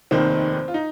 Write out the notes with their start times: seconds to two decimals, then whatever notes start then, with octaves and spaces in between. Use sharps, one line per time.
0.11 F1 D#2 D#3 C4
0.68 F4
0.74 D#4